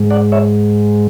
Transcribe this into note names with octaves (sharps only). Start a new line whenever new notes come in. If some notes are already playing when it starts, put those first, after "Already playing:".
Already playing: G#2 G#3
D5 F#5
C#5 E5